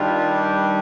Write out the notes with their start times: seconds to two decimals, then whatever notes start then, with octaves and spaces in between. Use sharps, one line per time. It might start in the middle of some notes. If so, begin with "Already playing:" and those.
Already playing: G2 D#3 G3 F4
0.30 G4